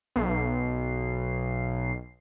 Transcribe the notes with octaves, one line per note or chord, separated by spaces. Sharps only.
B1 C7